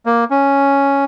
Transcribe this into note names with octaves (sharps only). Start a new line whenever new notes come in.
A#3
C#4